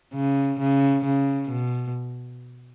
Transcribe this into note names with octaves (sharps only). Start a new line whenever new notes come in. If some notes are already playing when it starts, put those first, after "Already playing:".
C#3
C#3
C#3
B2